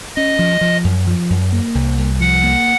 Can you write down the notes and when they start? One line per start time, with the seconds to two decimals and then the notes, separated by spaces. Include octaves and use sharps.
0.16 C#4 D#5
0.39 F3
0.61 F3
0.84 F#2
1.07 F3
1.30 F#2
1.52 A#3
1.75 C2
1.98 C2
2.20 F3 F#5
2.43 A#3